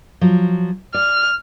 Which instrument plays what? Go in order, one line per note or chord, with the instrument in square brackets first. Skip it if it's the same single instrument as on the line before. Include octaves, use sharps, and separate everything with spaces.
[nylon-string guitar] F3 F#3
[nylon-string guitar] D5 [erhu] F6